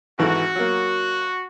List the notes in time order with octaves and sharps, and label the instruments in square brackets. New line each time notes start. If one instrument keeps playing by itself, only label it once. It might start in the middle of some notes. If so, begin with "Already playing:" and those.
[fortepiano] G#1 E3 A4 [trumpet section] F#4
[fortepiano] F#3 A#3